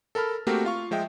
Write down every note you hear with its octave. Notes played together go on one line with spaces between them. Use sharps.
A4 A#4 A5 B5 F6
A3 A#3 C4 F#4 G4 A#4
F4 F5 C#6
F3 G#3 E5 G5